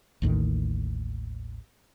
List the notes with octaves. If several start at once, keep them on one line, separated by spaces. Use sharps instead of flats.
A1 D#2 A2 D#3